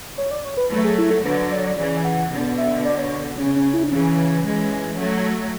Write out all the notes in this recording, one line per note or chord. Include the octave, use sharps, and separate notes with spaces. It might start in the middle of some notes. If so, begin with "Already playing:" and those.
C#5
D5
C#5
B4
F#3 A3 B4
G#4
E4
A4
D3 F#3 B4
D5
C#5
D5
C#3 E3 D5
G#5
F#5
B2 D3
E5
D5
C#5
C#5
F#4
C#3 C#4
C#4
E4
D4
C#3 E3 C#4
E3 G#3
F#3 A3